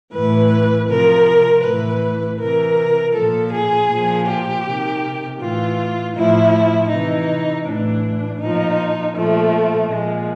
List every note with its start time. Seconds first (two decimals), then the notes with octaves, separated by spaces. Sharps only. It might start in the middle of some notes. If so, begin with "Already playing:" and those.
0.13 A2 E3 B4
0.88 C3 F3 A#4
1.63 A2 E3 B4
2.39 C3 E3 A#4
3.14 A#2 F3 A4
3.52 G#4
3.89 A#2 F3
4.26 G4
4.65 C3 D#3
5.39 A2 E3 F4
6.15 A2 F3 E4
6.90 C3 E3 D#4
7.65 A2 E3 D4
8.40 A#2 F3 D#4
9.15 A#2 F3 A3
9.92 A#2 F3 G#3